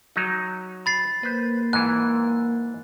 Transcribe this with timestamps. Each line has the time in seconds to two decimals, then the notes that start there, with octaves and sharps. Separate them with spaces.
0.16 F#3 D#4
0.86 B5 A6 C7
1.23 A#3 B4 C5
1.73 G#2 E3 F#6